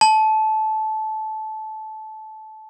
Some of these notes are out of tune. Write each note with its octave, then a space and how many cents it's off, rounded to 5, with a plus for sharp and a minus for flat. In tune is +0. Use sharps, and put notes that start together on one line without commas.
A5 -20